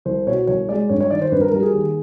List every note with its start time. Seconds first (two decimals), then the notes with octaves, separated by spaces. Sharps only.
0.05 C2 C5
0.27 B2 C#5
0.47 C2 C#5
0.69 G#3 D5
0.89 G2 C#5
1.00 C#5
1.10 D#3 D5
1.21 C5
1.32 G2 B4
1.41 A#4
1.52 G3 A#4
1.62 G#4
1.73 D#2